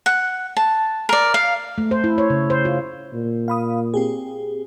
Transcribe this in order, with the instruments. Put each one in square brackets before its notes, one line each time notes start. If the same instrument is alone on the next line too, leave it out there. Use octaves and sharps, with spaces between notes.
[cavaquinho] F#5
A5
A#4 D5
F5
[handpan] A3
C5
E4
C#5
C#3
C5
F4
[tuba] A#2
[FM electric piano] F5 B5 D#6
C4 G4 G#4